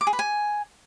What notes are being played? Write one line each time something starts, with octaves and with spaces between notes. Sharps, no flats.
D6
G#4
B4
G#5